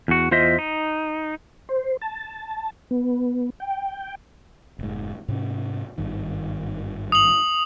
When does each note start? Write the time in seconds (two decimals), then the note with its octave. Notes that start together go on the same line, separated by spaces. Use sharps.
0.08 E2 F#4
0.31 E2 F4 C5 D#5 E5
0.59 D#4
1.69 C5
2.01 A5
2.91 B3
3.60 G5
4.79 F1 G#2
5.28 G#2 C3 C#4
5.98 G#1 G2 D#3
7.12 D#6 F#7